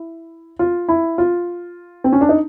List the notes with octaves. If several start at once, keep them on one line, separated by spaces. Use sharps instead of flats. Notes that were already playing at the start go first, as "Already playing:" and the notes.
Already playing: E4
F4
E4
F4
C4
C#4
D4
D#4